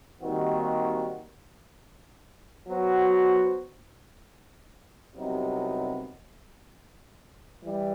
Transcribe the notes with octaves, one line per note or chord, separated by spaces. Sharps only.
D#2 D#3 G3 C4 F#4
F#3 B3 F#4 C5
C2 C3 F#3 B3 D#4
E3 G3